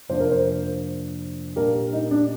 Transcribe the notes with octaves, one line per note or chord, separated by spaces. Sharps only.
F2 C3 F3 A#3 D4 C5
A#4
C5
A#2 G3 A#3 D4 G4 A#4
D#4
D4